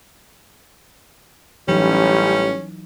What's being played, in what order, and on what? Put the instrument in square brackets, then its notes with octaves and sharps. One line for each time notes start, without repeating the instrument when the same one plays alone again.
[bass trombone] A1 [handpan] E3 F#3 D#4 [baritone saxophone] G3 [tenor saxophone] C#4